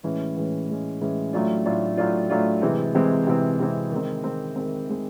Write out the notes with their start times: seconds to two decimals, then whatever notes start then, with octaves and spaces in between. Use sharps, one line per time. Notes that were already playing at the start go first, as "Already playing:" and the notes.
0.03 A2 E3 G#3 C#4
0.36 A2 E3 G#3 C#4
0.68 A2 E3 G#3 C#4
1.01 A2 E3 G#3 C#4
1.33 A2 F#3 A3 D4 F4
1.65 A2 F#3 A3 D4 F4
1.97 A2 F#3 A3 D4 F4
2.30 A2 F#3 A3 D4 F4
2.62 C3 E3 G#3 C4
2.95 C3 E3 G#3 C4
3.27 C3 E3 G#3 C4
3.59 C3 E3 G#3 C4
3.91 D#3 G#3 C4
4.24 D#3 G#3 C4
4.56 D#3 G#3 C4
4.88 D#3 G#3 C4